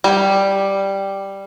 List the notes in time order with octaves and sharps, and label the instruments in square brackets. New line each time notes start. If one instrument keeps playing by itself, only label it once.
[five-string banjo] G3